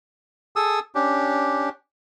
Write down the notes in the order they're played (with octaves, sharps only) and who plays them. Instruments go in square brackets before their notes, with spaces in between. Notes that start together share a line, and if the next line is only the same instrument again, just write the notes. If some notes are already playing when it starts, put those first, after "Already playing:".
[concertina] G#4 A4 D#6 E6
C#4 D4 G4